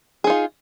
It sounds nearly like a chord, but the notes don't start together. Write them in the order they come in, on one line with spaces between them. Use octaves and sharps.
G#4 D#4 F4